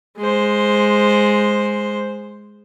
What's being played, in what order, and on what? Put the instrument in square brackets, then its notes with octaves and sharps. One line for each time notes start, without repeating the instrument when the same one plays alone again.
[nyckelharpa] G#3 C5